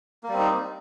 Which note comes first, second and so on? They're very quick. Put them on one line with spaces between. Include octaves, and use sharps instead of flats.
A#3 G3 C4 D#4